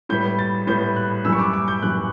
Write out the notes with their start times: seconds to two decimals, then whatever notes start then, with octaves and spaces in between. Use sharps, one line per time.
0.09 A2 G3 B3 G6
0.39 A6
0.67 A2 G3 B3 G6
0.96 F#6
1.25 F#2 E3 G3 E6
1.32 C#6
1.39 D6
1.53 D6
1.68 G6
1.82 F#2 E3 G3 F#6